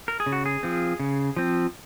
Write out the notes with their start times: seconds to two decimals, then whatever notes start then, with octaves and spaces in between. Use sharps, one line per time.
0.08 A#4
0.20 G#4
0.26 C#3
0.32 F#4
0.46 G#4
0.63 F3 C4
1.00 C#3
1.37 F3 C4